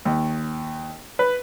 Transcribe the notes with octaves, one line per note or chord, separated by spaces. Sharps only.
D#2
B4